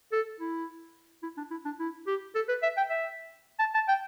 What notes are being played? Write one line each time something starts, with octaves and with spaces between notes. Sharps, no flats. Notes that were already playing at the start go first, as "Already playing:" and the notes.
A4
E4
E4
D4
E4
D4
E4
G4
A4
B4
E5
G5
E5
A5
A5
G5